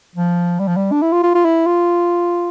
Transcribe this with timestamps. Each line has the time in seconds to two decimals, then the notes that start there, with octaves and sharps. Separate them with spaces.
0.16 F3
0.60 G3
0.68 F3
0.77 G3
0.92 D4
1.02 E4
1.12 F4
1.23 F4
1.35 F4
1.45 E4
1.66 F4